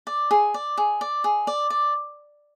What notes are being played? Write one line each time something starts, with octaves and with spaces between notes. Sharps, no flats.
D5
G#4
D5
G#4
D5
G#4
D5
D5